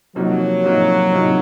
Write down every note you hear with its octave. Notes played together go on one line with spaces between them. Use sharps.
C3 F3 F#3 A#3 D#4 F#4
C3 F3 A#3 D#4 F#4
C3 F3 A#3 D#4 F#4